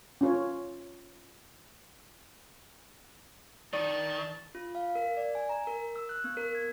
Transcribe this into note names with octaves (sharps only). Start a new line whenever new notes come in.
C#4 F4 C#5
D#3 D5 A5
F4
F5
A#4
D5
G#5
A#5
A#4
E6
F#6
B3
A#4
G#6